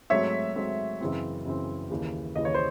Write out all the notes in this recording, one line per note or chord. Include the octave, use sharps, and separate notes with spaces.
G#2 F#3 A3 C4 C#5 E5
G#2 F#3 A3 C4
F#2 C#3 E3 C4
F#2 C#3 E3 C4
D#2 C#3 E3
D#2 C#3 E3 D#5
C#5
C5